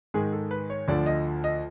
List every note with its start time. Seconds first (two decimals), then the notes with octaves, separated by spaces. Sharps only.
0.14 G#2 D#3 G#3 G#4
0.32 A4
0.51 B4
0.70 C#5
0.88 D2 D3 F3 D5
1.06 D#5
1.44 D#5